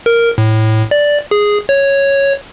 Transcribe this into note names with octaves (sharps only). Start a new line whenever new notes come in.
A#4
A2
D5
G#4
C#5